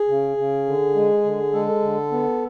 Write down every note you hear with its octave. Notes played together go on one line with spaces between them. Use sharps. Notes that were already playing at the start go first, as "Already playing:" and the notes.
Already playing: G#4
C#3
C#3
D3
G#3
D3
G#3 A4
D3
B3